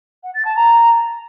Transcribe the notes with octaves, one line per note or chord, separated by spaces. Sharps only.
F#5
A6
A5
A#5